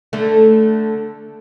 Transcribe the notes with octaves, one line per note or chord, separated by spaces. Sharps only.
D3 A3